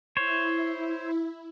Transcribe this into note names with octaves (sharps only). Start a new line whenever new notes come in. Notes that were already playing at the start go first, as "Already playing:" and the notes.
E4 C5 C#5